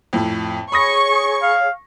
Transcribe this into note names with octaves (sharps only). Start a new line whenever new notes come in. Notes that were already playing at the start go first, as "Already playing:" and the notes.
F2 A2
G#4 C#5 B5 C#6 D#6 A#6
F5